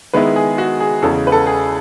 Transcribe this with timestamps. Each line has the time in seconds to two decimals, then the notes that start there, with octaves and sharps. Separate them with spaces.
0.13 D#3 G#3 B3 E4 B4
0.36 G#4
0.58 F#4
0.80 G#4
1.02 E2 C#3 G#3 A4
1.27 B4
1.32 A4
1.47 G#4